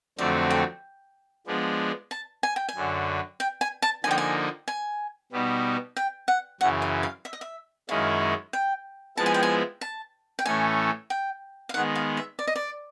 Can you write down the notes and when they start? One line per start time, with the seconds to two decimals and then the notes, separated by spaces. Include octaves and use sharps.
0.19 F2 D3 F#3 A3 C4 D5
0.50 G5
1.47 F3 G#3 B3 D4
2.11 A5
2.43 G#5
2.56 G5
2.69 G#5
2.75 F#2 D3 F#3
3.40 G5
3.61 G#5
3.82 A5
4.04 D3 F3 A#3 D#4 G#5
4.11 G5
4.18 G#5
4.68 G#5
5.32 B2 G3 B3 D#4
5.97 G5
6.28 F#5
6.61 F#2 C#3 E3 F#5
6.82 F5
7.03 F5
7.25 E5
7.33 D#5
7.41 E5
7.89 F#2 D#3 G#3 C#4 E4 F5
8.53 G5
9.17 F3 G#3 B3 E4 A5
9.26 G#5
9.34 G5
9.43 G#5
9.81 A5
10.39 G5
10.46 A2 E3 A3 C#4 G#5
11.10 G5
11.69 F5
11.74 D#3 G#3 B3 F#5
11.95 F5
12.17 E5
12.39 D5
12.47 D#5
12.56 D5